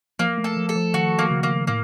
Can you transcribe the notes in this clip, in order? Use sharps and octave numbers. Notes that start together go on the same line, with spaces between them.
F3 A#3
A3
A4
F3
A4
F3
D#3 F#4
A#3
C#3
A#3
A2 A#3